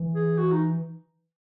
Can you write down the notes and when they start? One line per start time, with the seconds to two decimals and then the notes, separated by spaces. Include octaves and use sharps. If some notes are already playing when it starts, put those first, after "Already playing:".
Already playing: E3
0.15 G#4
0.38 F#4
0.52 D#4